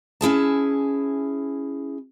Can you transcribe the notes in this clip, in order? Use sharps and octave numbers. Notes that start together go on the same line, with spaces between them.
C#4 E4 G#4 A5